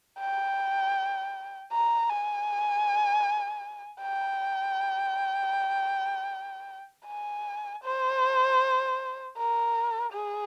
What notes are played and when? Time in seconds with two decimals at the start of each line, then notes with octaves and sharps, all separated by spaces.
0.20 G5
1.73 A#5
2.10 G#5
4.02 G5
7.07 G#5
7.84 C5
9.38 A#4
10.13 G#4